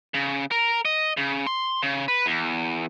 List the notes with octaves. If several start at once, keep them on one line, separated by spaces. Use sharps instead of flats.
C#3
A#4
D#5
C#3
C6
C#3
B4
E2